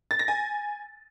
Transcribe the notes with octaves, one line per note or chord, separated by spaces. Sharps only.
A6
A#6
G#5